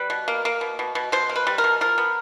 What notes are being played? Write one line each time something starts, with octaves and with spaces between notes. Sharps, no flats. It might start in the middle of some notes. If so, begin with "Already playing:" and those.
Already playing: G3 B4
B2
A#3
A#3
B2
B2
B2
B2 C5
A#3
B4
G3
A#4
B2
F3 A#4
B3